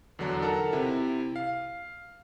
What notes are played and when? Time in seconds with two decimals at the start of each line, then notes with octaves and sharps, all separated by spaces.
0.19 E2 D3 F#3 D4 A#5
0.42 D#4 A4 A#4 F#5 A5 A#5
0.73 C3 E4
1.36 F5